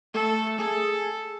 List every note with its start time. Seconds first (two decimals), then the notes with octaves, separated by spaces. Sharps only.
0.14 A3 A4
0.59 G#4 A4